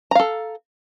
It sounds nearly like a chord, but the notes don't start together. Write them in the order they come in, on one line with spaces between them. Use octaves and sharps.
A#5 F5 A4